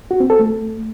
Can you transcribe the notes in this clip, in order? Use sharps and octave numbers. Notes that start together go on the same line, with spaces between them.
F#4
C4
A4
A3